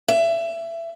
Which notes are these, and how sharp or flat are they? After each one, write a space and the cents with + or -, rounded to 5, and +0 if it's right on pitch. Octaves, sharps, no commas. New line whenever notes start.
E5 +20